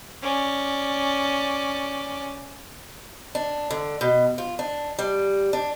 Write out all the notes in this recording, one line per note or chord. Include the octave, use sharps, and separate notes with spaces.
C#4 D5
D4
D3
B2
F4
D4
G3
D4